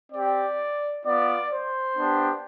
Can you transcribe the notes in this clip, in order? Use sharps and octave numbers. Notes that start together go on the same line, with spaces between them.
C4 G4 D5
B3 F4 D5
C5
B3 D4 G4